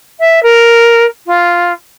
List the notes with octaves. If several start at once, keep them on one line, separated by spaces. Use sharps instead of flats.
E5
A#4
F4